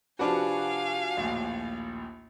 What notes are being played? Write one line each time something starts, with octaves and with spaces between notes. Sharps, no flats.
C3 F3 D4 F#4 B4 F5 G#5
A#1 D#2 A2